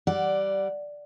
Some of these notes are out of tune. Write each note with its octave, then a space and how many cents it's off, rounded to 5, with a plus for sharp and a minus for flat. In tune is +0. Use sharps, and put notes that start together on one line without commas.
G3 -15 D5 +0 F#5 +5